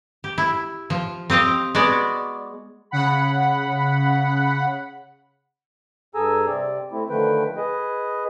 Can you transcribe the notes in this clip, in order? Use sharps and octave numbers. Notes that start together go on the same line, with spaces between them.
G4
E4
F3
C4 G4 D#5 F5
G#3 B3 F#4 D5
C#3 F#5 B5
G2 G#4 A4 G#5 A#5 E6
C3 C4 D5
A3 C4 E4
D3 D#3 F3 A3 B4 G5
G#4 B4 D#5